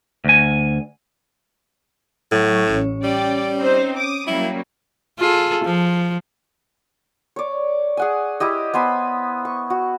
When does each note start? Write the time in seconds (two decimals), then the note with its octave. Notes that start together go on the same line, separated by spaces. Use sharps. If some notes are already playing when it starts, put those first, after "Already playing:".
0.24 D2 G#5
2.32 A2 F#3 C#6
2.67 A1 C#4 C#5
3.04 G3 D5 G5
3.58 C4 D#4 C5
3.97 D6 D#6
4.27 F#3 G3 A#3 E4
5.19 F4 G#4 A4
5.65 F3
7.36 C#5 D5
7.97 G#4 F#5 G#5
8.40 E4 G4 D#5
8.74 B3 C5 G#5 B5
9.45 C#6
9.70 F#4